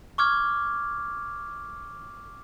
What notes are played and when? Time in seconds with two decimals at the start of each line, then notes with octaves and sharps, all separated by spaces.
0.18 C#6 D6 F6 G#6